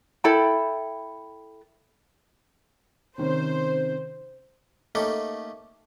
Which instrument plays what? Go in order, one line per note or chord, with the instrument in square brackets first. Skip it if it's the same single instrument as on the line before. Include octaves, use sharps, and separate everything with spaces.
[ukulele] E4 A4 G5 B5
[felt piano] C3 D#3 C#4 [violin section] C5
[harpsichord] A3 A#3 C#4 D#4 G4 A4